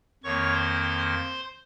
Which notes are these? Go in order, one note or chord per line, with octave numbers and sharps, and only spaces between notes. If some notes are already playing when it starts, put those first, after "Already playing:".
F2 D#3 A#3 C#5 C#6
C5 C6
C5 C6